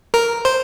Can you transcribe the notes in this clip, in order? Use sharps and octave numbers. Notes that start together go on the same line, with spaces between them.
A#4
C5